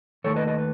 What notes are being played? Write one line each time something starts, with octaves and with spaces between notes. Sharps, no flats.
D#2 D#3 A3 A4 C#5
B4 D#5
B4 D#5
B4